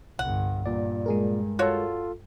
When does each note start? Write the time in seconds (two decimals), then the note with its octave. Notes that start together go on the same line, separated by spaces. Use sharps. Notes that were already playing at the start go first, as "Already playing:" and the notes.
0.19 G1 C2 G2 F#5
0.66 G2 A#2 D5
1.06 G#3 G#4 A#4
1.59 F4 F#4 A4 C#5